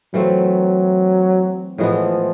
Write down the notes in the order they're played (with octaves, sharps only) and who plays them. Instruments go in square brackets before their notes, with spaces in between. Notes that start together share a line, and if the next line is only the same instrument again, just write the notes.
[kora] E3 A3 C4 F4 [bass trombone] F#3
[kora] A2 E3 G#3 B3 [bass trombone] F3